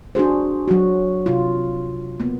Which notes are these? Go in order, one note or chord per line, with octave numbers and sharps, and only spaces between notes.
D4 F#4 G#4 C5
F#3 F#4
C3 F4
A#3 B3